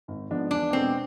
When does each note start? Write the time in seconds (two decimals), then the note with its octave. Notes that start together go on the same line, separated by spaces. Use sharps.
0.08 G#1
0.30 G#2 F3 B3 D4
0.51 E2 D4
0.73 B2 G#3 C4